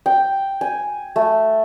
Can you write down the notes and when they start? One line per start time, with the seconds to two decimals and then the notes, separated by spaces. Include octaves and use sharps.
0.06 G5
0.61 G#5
1.16 A3